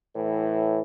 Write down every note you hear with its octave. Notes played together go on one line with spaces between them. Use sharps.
A2 E3